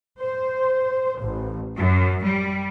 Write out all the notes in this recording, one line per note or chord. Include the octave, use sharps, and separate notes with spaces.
C5
A1
F#2
G3